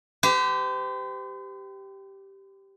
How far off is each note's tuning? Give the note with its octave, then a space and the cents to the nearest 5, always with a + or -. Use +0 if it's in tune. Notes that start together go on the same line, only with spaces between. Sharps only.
G4 -5 C5 -45